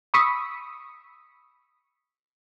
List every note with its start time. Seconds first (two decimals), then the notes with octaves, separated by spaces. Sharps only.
0.14 B5 C#6 D#6 E6 B6 C#7